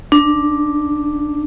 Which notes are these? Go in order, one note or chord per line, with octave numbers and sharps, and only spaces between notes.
D4